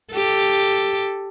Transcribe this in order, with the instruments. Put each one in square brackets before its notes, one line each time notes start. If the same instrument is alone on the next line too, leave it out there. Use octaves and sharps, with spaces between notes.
[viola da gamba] G4 A4